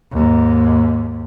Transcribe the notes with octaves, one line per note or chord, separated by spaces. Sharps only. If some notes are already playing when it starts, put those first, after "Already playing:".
D#2 G#2